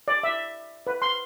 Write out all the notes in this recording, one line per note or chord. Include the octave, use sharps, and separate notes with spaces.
D5
E5
B4
C6